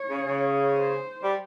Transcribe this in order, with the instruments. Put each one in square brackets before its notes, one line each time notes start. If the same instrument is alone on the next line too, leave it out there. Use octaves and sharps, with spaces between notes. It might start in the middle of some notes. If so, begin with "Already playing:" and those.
Already playing: [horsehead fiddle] C#5
[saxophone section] C#3
C#3
[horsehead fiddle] C5
[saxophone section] G3